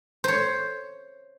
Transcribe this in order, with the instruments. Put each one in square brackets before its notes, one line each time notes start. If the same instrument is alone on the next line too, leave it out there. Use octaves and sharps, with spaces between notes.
[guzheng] C5 C#5